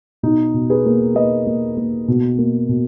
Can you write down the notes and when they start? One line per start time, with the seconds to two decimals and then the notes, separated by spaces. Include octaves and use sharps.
0.23 B2 D#4
0.54 B2
0.70 G#4 B4
0.86 A#3
1.15 A#3 B4 D#5
1.47 A#3
1.77 A#3
2.08 B2
2.38 A#3
2.69 B2